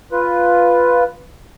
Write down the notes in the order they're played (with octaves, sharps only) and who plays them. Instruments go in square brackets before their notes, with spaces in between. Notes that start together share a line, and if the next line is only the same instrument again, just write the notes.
[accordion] F4 B4